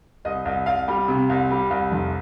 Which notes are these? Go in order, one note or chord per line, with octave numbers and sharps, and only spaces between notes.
C2 D#5
C2
C2 F5
G3
C3
C2
G3
C2
F1